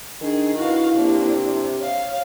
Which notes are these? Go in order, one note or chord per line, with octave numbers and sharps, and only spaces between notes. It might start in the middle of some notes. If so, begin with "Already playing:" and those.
D#3 D4 G#4
E4 F#4 B4 F5
C3 A#3 D4
C#5 F5